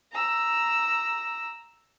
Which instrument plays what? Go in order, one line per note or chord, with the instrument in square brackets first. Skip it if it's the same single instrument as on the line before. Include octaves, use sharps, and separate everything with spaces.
[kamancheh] A#5 E6